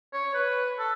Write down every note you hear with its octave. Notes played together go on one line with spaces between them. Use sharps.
C#5
B4
A4